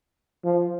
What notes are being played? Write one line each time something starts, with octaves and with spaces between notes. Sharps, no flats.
F3